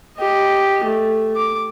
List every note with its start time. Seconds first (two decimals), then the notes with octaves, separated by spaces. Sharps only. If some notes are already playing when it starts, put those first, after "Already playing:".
0.17 G4 D#5
0.84 A3
1.36 D6